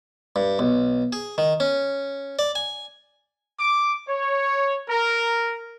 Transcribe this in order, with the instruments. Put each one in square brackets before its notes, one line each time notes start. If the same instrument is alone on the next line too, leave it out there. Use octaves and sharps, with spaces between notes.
[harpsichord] G2
B1
G#4
D#3
C#4
D5
G#5
[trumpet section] D6
C#5
A#4